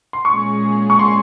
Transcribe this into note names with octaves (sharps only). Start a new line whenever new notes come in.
C6
A#2 G#3 C#4 G#4 C#6
C#6
C6